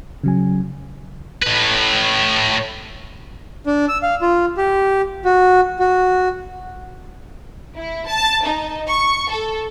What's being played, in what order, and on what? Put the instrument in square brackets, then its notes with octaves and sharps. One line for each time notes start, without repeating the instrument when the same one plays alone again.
[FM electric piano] C#3 F#3 G#5
[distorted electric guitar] A2 B4
[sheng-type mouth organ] D4
E6
F5
F4
G4
F#4
F#4
[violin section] E4
A5
D#4
C#6
A4